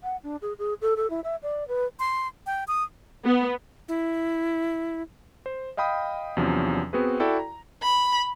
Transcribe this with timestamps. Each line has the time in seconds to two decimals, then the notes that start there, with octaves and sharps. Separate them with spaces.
0.03 F#5
0.23 D4
0.42 G#4
0.59 G#4
0.81 A4
0.96 A4
1.10 E4
1.24 E5
1.43 D5
1.68 B4
1.99 C6
2.47 G5
2.68 D#6
3.24 B3
3.88 E4
5.46 C5
5.77 D#5 F5 G5 B5 D#6
6.37 E2 C3 F3 F#3 C#4 D4
6.93 B3 C4 F#4 G#4 B4
7.20 E4 F#4 A4 D5 G5
7.39 A#5
7.83 B5